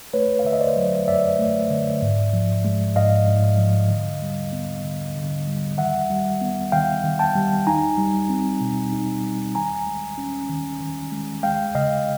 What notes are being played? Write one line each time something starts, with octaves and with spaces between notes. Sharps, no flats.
A3 B4 C#5
F5
D3 E5
D#5
C5 D5
F#3
F#2 D5 E5
A3
D3
G#2
F3
G#3
G#2 D#5 F5
G#2
F3
D3
G3
B3
D3
D3
G3
D#3 E5 F#5
G3
B3
D#3 F5 G5
D#3
G5 A5
G3
D#4 G#5 A#5
G3
C4
B2
D#4
G3
D#3 G#5 A#5
G#3
C#4
D#3
D#3
G#3
G#3 F5 G5
C#3 D#5 F5